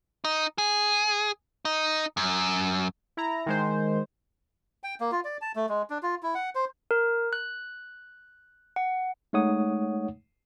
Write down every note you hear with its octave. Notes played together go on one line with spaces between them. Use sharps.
D#4
G#4
D#4
F#2
E4 A#5
D#3 G#3 C5
G5
A#3
F4
D5
A5
A3
G#3
D4
F4
E4
F#5
C5
A#4
F#6
F#5
G#3 A3 D#4 C#5 F#5 D#6